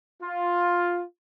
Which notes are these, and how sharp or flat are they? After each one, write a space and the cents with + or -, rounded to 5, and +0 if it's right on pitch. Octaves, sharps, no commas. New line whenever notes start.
F4 +5